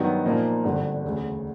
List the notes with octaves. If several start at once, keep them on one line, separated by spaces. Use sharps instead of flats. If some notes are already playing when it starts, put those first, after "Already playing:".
Already playing: G2 D#3 F#3 B3
A#2 F3 A#3 D#4
G#1 G2 D3
E1 D2 C#3